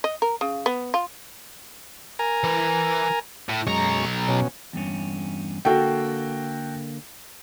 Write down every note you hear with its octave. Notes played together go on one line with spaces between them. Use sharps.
D#5
A#4
C#3
B3
F4
A#4 G#5 A#5
E3
A2
B1 F#2 G#3 A#5 C#6
B2 C#4
E2 G2 C#4
D3 A#3 F#4 A4 G5